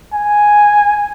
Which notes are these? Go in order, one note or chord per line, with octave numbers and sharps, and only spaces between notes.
G#5